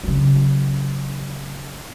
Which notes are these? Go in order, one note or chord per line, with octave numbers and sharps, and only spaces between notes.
C#3 F#3